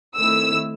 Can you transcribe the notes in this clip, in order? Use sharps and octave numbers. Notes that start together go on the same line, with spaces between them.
D#3 A3 C4 E4 E6